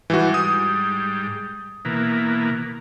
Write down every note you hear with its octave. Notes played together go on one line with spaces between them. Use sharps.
G#2 E3 G3 F#4
D#6
B2 E3 A#3